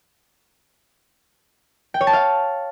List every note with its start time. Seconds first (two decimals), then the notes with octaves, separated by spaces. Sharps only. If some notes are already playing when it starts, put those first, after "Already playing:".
1.94 G5
2.01 C#5
2.07 A5
2.13 F5